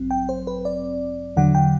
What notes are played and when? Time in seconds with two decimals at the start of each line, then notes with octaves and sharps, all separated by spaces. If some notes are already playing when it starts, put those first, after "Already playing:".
Already playing: A1 G2 F#3 C4
0.11 G5
0.29 C5
0.47 B4
0.65 D5
1.37 E2 D3 F#3 F#5
1.55 G5